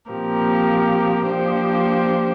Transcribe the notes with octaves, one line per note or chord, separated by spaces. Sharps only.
A#2 F3 C4 G4 A#4
F3 A#3 D4 G4 C5